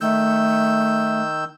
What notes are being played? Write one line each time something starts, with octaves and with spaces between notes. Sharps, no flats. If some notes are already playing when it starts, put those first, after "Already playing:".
D#3 A3 E6 G6